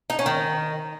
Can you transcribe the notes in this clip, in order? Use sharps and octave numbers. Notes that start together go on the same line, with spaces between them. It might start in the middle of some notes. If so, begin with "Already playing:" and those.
D#4
C#4
D#3